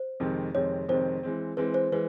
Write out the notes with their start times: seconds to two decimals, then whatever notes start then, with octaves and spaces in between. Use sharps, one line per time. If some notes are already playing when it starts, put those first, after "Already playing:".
Already playing: C5
0.20 F2 C3 D#3 G#3 C4
0.54 F2 C3 D#3 G#3 C4 C#5
0.89 F2 C3 D#3 G#3 C4 C5
1.23 E3 G#3 C4
1.57 E3 G#3 C4 B4
1.74 C5
1.92 E3 G#3 B4